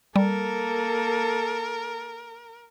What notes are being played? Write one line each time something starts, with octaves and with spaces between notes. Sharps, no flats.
G3 A#3 A4 A#4